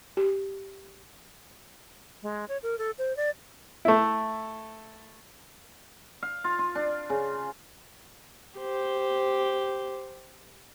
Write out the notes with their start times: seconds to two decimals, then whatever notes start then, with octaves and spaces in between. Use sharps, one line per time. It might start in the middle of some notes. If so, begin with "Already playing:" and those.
0.17 G4
2.23 G#3
2.49 C#5
2.63 A#4
2.78 A4
2.98 C5
3.17 D5
3.85 A3 E4
6.23 F5
6.44 F4
6.59 F4
6.75 D4
7.10 C#3
8.58 G4 C5